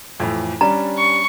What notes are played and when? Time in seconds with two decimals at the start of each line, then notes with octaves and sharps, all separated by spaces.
0.20 F2 A2 E3
0.61 G3 C#4 D4 A#5
0.97 C#6